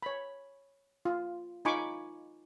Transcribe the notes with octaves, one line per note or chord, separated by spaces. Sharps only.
C#5 B5
F4
D#4 F4 G#5 B5 C#6 D6